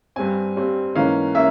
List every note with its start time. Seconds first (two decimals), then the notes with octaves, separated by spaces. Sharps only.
0.16 G2 G3 C4 G#5
0.56 G2 G3 C4
0.95 G#2 E3 A#3 C#4 F5
1.35 A#3 C#4 E5